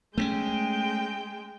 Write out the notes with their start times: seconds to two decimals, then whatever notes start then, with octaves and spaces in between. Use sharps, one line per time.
0.18 G#3 A3 B3 C#4 G5